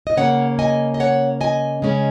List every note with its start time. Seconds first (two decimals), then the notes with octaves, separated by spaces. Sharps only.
0.07 D#5
0.17 C#3 A#3 C#4 C#5 F#5
0.59 D#5 G#5
0.94 D#5
1.00 C#5 F#5
1.41 D#5 G#5
1.82 C#3 G#3 C#4